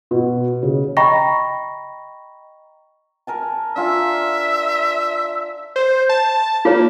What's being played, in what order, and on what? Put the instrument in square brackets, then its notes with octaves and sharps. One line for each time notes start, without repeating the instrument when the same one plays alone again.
[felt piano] B2
C#3
[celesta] D#5 G5 A#5 B5 C#6 A#6
[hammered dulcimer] A#4 G#5 A5
[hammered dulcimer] D4 F4 G#5 [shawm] E5
[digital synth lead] C5
A5
[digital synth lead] A#3 [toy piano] F4 C#5